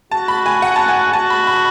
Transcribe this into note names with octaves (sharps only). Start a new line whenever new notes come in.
F#4 A5
B5
G#5
F#5
A5
G#5
F#4 A5
B5
B5